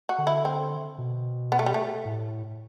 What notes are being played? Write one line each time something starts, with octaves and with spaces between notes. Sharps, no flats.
F#4
D3
E4
C4
B2
B3
A3
G3
A3
A2